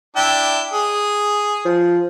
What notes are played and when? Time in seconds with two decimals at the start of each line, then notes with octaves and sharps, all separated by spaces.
0.16 D4 E4 G5
0.74 G#4
1.65 F3